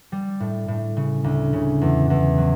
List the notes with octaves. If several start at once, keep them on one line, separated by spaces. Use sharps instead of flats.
G3
A2
A2
C#3
D2
C#3
E2
E2
F#3